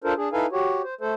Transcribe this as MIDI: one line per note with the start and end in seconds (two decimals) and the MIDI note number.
0.04 0.14 62
0.04 0.14 65
0.04 0.14 69
0.04 0.14 70
0.04 0.14 72
0.17 0.29 62
0.17 0.29 68
0.33 0.46 63
0.33 0.46 64
0.33 0.46 69
0.33 0.46 71
0.33 0.46 77
0.33 0.46 80
0.52 0.82 66
0.52 0.82 67
0.52 0.82 73
0.83 0.94 72
1.01 1.14 57
1.01 1.14 69
1.01 1.14 72